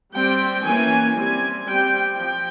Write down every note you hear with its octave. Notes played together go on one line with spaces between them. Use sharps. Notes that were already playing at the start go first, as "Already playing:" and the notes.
G3 C4 G5
E3 A#3 C#4 G#5
G3 C4 G#5
G3 C4 G5
F3 G5